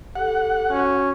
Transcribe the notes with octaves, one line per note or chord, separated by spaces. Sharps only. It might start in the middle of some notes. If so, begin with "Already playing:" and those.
G4 A4 F#5
C#4 F#4